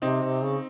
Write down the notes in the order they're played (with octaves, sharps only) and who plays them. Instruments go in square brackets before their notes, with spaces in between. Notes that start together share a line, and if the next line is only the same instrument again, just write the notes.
[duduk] C3 [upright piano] C4 D#4
[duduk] C3
C#3